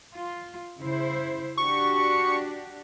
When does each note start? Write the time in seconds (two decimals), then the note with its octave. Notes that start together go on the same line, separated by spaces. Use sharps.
0.14 F4
0.81 C#3 E4 C5
1.58 D4 F#4 G4 C#6